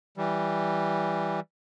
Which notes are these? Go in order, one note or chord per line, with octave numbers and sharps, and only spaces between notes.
E3 G3